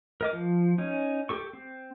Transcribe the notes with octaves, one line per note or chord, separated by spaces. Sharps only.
A#4 D#5 D6
F3
C#4 D#4
G4 A4 C#6
C4